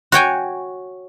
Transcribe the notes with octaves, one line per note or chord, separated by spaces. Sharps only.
F#4 C#5 G5 G#5